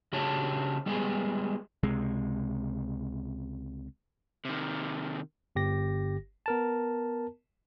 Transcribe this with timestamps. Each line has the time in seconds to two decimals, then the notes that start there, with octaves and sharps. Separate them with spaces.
0.13 C#3 D4 F#4 G4 C#5 A5
0.86 G3 G#3 B3 G4 G#4
1.83 C#2 C3 G#3
4.45 C3 D#3
5.56 G1 G4 A#6
6.46 B3 A#4 A5